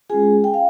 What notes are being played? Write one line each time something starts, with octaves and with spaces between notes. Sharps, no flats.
G#3 C#4 F4 G#4 G#5
G5
F5